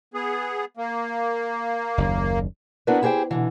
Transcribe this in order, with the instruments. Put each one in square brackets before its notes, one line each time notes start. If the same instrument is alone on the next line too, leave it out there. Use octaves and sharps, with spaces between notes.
[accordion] B3 G#4
A#3
[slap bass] F#1 D#2
[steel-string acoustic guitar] B3 D4 E4 F#4 A#4 B4
E4 G4 G#4 A#4 C5 G5
B2 D3 E3